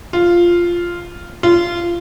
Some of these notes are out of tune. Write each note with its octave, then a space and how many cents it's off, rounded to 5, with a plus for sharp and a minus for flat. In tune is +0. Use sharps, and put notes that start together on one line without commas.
F4 -5
F4 -20